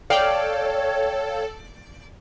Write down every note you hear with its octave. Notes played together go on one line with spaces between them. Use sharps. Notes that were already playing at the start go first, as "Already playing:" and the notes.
A4 C#5 D5 F5 G5